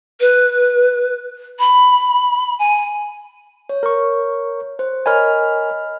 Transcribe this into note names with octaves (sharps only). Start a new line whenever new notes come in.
B4
B5
G#5
C#5
A#4 C#6
C5
A#4 C#5 D#5 G#5 B5 F6